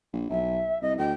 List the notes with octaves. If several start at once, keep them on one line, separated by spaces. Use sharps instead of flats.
A#1
B1 E5
C2 D#5
D2 G5